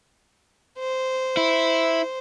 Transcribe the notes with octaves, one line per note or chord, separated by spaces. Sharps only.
C5
E4